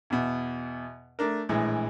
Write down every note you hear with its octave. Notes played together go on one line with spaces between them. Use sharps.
E2 B2
A3 D4 A#4
A#1 A2 E3 G#3